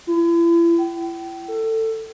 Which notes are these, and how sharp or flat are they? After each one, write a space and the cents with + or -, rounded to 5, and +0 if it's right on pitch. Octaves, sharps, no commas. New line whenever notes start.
E4 +40
G5 -35
A4 +20